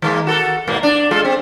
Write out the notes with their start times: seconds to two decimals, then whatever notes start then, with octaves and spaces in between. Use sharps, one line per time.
0.02 D#3 G#3 A#3
0.27 F#4 A4 A#4
0.68 G#2 B2 A#3
0.83 D4
1.11 G#3 F4 A4
1.25 C4